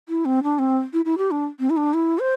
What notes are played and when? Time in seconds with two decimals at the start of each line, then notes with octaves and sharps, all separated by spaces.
0.09 E4
0.25 C4
0.43 D4
0.59 C4
0.93 E4
1.05 E4
1.18 G4
1.31 D4
1.60 C4
1.70 E4
1.77 D4
1.94 E4
2.19 C5